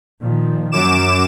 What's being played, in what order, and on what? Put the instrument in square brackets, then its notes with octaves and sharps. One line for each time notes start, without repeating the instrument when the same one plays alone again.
[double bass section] A#2 D#3 F3
[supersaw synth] F#2 D6 E7